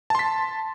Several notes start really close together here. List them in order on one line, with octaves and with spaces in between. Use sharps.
A5 C6 B6